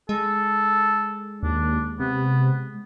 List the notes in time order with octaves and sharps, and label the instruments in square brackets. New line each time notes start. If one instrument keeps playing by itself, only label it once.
[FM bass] G#3 [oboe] A4
[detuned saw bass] D#2 [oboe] D4
[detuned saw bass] C3 [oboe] B3